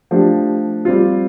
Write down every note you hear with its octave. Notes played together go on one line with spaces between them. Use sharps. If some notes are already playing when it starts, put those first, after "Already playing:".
F3 A3 D4 G4
G3 C4 F4